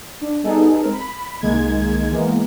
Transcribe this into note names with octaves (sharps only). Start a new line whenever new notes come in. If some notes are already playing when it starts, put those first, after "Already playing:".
D4
G3 B3 D#4 G#4 A4
G#3 C4 A#4
B5
C2 D#3 G#3 A#3 G#6
E3 G#3 A#3 B3